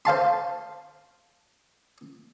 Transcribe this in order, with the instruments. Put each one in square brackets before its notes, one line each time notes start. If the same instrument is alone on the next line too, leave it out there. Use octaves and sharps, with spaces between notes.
[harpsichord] C5 F5 A5 C6